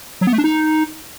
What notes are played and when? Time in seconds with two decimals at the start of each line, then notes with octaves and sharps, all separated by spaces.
0.21 F#3
0.27 B3
0.33 A3
0.38 D4
0.44 D#4